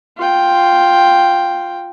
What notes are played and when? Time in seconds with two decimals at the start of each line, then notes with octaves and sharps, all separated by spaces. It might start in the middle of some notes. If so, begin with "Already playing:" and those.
0.17 F4 G5